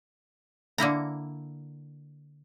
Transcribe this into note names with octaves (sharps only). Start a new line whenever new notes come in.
D3 A#3 E4 A#5